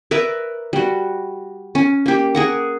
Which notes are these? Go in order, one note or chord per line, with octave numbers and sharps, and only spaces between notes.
A#4 B4 D5 E5
G3 F#4
C#4
A#3 G4
G#4 A#4 F#5